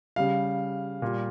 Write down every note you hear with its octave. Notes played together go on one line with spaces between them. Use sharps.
C#3 G3 F5
A#2 G3